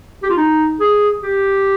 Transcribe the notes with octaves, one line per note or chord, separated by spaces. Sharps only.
G4
F4
D#4
G#4
G4